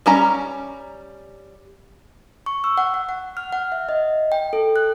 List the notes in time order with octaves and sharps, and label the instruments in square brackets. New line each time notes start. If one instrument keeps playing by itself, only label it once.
[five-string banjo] G3 C#4 A#5
[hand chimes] C#6
E6
F#5
F#5
F#5
F6
F#5
E5
D#5
G5
A4
F#6